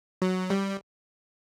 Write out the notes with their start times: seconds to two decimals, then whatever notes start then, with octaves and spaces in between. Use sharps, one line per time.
0.22 F#3
0.50 G3